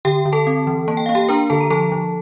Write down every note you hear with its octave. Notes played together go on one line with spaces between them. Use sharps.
D3 G4 G5
D3
A4 A5
C4
E3
A#3 A5
G5
A#3 F5
G4 G5
D4 A#4 A#5
D3 A4 A5
A#5
F3 A4 A5
F3